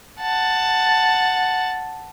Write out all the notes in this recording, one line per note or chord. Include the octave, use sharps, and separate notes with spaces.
F#5 A5